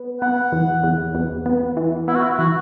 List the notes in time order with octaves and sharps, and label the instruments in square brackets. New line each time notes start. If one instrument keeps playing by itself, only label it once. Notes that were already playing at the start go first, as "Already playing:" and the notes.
Already playing: [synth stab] B3
[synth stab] B3 [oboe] F#5
[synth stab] E2
E2
E2
B3
E3
[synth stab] B3 [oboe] E4
[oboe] F#4
E4
[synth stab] E3 [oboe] F#4